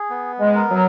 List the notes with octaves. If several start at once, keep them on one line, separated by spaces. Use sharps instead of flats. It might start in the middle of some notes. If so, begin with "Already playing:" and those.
Already playing: G#4
B3
G#3
A#4
F#3